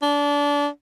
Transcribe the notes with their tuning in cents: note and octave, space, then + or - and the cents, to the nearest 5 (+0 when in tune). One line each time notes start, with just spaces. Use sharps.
D4 -25